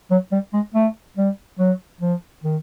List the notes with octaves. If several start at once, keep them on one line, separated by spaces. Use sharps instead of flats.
F#3
G3
G#3
A3
G3
F#3
F3
D#3